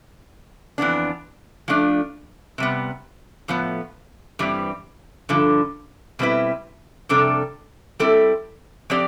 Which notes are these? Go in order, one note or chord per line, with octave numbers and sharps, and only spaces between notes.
F2 E3 B3 D4
F3 A3 D4 F4
C3 G3 B3
A2 F3 B3
G2 E3 G3 C4
G2 D3 F3
B2 G3 C4 E4 B4
F2 C3 G3 D4 A4
G3 C4 E4 A4
F3 C4 G4 D5